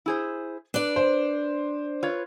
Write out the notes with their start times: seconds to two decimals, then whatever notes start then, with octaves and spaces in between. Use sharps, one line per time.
0.06 E4 G#4 C5
0.74 D4 B4 D5
0.96 C5
2.03 F4 B4 C#5